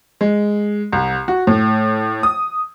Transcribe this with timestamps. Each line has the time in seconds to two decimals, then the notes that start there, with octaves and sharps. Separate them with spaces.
0.21 G#3
0.92 C2
1.28 F#4
1.47 A2
2.23 D#6